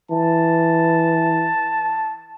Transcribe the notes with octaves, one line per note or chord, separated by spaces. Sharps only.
E3 A5